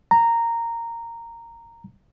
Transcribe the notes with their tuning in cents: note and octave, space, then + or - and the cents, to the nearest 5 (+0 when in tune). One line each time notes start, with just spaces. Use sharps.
A#5 -10